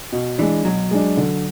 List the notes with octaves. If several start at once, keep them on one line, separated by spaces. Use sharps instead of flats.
B2
E3 G#3 D4
B2 F#3
G#3 D4
D3